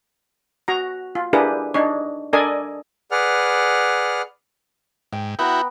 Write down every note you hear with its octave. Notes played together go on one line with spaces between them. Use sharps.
F#4 A#5
F4
D4 E4 G4 G#4 A#4 B4
D4 D#4 C#5
D4 A4 A#4 D5 D#5 G#5
G#4 B4 D5 F#5 F6
G#2 G5
B3 E4 F#4 G5 A#5